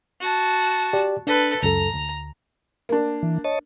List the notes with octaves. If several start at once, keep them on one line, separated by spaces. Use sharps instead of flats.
F#4 A5
G4 D5
D4 A4 B4
C#2 F#2 A4 A#5
D2
A#3 D4
E3
C#5 D#5 A5